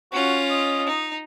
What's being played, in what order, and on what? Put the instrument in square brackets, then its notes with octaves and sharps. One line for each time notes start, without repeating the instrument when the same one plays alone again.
[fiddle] C#4 F4 [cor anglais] F#4
[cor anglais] D#5
[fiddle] D#4